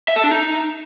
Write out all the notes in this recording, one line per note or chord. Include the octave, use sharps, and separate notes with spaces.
E5
A4
D4
D#4